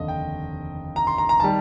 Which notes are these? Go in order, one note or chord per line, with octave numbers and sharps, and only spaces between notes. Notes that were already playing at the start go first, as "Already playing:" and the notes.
Already playing: F1 D#2 D3 D#5
G5
A#5
C6
A#5
A#5
D#3 G3 A5